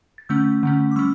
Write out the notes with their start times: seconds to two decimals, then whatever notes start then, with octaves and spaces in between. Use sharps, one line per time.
0.18 A6
0.29 D3 A3 C#4 E6 G6
0.63 D3 A3 C#4
0.91 D6
0.96 G3 C#4 C#6 E6